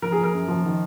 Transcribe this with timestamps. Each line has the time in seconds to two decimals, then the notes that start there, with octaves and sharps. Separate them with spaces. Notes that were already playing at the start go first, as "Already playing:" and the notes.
0.02 F3 A#4
0.12 G#4
0.18 F3
0.23 A#4
0.33 F#2
0.48 F3
0.64 D#3